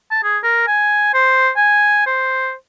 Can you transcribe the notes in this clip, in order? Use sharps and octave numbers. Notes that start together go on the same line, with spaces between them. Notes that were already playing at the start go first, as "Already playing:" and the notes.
A5
G#4
A#4
G#5
C5
G#5
C5